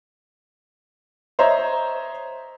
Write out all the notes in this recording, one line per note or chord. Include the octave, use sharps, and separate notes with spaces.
C5 C#5 D#5 E5 A#5